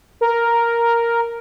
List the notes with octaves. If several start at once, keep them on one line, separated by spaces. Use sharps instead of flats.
A#4